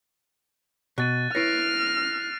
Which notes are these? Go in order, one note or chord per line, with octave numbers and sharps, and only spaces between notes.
B2 F#6 A6 D#7
E4 B4 C#5 F6 A#6 C7 D7